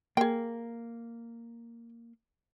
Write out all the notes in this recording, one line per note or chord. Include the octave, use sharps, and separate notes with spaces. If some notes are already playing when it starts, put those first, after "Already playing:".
A#3 G#4 G5